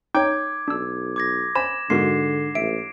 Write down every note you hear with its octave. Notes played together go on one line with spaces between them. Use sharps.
D#4 C#5 G5 D6 G#6
B1 D4 E6
D6 G#6 A#6
C5 G#5 B5 E7
G#2 D3 F#4 A#4 C6 C7
A1 E5 D7